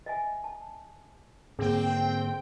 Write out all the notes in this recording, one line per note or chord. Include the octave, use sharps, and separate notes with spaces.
D#5 E5 G#5
A5
G#2 D3 A#3 C4 G#4 G5